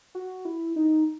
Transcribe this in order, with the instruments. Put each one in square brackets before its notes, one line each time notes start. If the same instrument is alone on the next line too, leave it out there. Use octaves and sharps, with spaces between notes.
[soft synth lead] F#4
E4
D#4